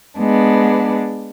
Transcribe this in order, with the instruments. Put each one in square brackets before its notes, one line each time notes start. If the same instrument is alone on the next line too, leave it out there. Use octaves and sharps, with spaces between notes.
[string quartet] G#3 B3 D4